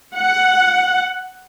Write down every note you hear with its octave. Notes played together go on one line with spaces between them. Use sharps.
F#5